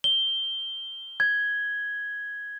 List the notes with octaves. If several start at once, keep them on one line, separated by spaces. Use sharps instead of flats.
G7
G#6